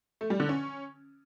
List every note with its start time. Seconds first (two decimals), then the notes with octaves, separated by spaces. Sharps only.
0.21 A3
0.30 G3
0.40 D3
0.49 C#4